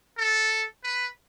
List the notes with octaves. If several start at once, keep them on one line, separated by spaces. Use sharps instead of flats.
A4
B4